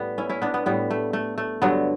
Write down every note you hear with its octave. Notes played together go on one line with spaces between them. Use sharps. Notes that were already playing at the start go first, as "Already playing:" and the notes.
Already playing: A2 G3 B3
C#4 E4
C#4 E4
B3 D4
B3
A2 G3 B3
A3
A3
A3
G2 D3 F#3 B3